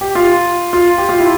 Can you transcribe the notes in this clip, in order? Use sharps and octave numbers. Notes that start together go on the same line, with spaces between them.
G4
F4
F4
G4
F4
E4